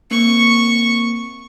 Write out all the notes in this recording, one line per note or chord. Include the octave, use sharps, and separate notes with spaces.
A#3 C4 C#6